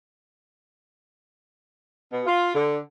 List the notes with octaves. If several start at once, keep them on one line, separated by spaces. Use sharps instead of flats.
B2
F4
D3